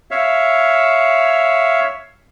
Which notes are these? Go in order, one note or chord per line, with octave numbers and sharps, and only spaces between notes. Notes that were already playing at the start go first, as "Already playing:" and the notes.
C#5 E5 F5